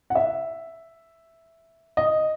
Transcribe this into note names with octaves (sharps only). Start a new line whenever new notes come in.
F#5
E5
D#5